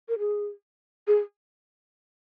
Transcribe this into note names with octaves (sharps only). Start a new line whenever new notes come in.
A#4
G#4
G#4